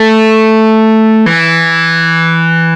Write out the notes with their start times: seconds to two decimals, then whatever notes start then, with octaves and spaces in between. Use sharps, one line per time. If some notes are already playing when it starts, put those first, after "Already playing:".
Already playing: A3
1.26 E3